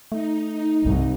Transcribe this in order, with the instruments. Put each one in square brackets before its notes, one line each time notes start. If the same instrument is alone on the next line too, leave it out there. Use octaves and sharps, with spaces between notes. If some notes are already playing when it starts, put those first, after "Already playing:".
[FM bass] A3 [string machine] D#4
[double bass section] C2 [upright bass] G2